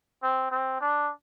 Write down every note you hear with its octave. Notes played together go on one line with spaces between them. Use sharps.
C4
C4
D4